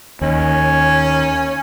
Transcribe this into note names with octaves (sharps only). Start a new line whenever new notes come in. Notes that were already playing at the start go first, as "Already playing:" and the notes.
D#2 C#4